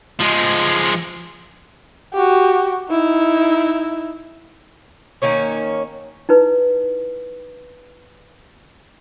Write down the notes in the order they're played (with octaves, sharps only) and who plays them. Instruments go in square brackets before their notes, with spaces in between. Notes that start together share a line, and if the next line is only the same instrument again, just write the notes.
[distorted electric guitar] F3 G#3
[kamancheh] F#4 G4
D#4 E4
[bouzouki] D#3 A#3 C#4 C#5
[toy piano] D#4 E4 B4